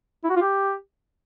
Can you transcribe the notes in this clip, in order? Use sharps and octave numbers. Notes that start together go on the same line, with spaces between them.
E4
F#4
F4
G4